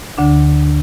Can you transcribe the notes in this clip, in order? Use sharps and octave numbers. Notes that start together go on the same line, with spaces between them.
D2 D3 D4